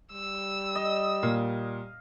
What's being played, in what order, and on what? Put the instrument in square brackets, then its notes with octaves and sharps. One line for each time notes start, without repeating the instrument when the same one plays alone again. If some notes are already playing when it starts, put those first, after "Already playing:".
[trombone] G3 [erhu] E6
[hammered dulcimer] D#5
[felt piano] A#2 [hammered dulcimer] F5